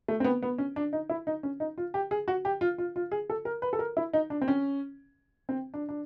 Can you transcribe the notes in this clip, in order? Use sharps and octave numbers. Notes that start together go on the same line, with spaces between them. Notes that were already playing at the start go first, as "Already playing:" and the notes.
A3
C4
B3
B3
C#4
D4
D#4
E4
D#4
C#4
D#4
F4
G4
G#4
F#4
G4
F4
F4
F4
G#4
A4
A#4
B4
A4
A#4
E4
D#4
D4
C4
C#4
C4
D4
D4